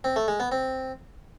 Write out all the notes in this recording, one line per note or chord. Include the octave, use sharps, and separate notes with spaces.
C4
A3
G#3
B3
C4